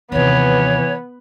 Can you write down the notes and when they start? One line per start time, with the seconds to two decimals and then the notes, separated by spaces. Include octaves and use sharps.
0.12 D#2 C3 E3 B3 C#5